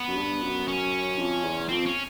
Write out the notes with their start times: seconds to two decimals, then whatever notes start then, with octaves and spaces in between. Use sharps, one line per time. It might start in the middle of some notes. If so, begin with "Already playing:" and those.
Already playing: B3
0.08 F#2
0.17 G2
0.43 F#2
0.68 C#4
1.18 F2
1.44 E2
1.69 F2 C4
1.86 C#4